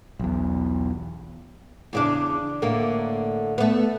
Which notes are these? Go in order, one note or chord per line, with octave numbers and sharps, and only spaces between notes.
B1 E2
E2 C#3 D4
A2 D3 A#3
A3 B3